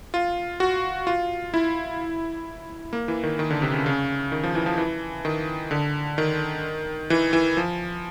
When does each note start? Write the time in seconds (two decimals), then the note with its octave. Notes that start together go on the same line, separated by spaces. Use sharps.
0.14 F4
0.60 F#4
1.07 F4
1.54 E4
2.93 A#3
3.08 E3
3.23 D#3
3.39 D#3
3.51 D3
3.62 C3
3.73 C#3
3.86 C#3
4.32 D#3
4.43 F3
4.55 E3
4.66 F3
4.78 E3
5.25 D#3
5.71 D3
6.18 D#3
7.10 E3
7.33 E3
7.57 F3